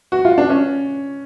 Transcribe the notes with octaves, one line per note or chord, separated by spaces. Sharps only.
F#4
F4
D4
C#4